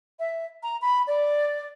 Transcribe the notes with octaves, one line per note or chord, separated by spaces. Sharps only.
E5
A#5
B5
D5